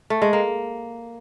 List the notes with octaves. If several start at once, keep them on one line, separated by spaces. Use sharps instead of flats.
A3
G#3
A#3